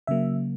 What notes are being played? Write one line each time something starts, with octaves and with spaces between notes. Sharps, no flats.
C#3 F#3 A#3 E5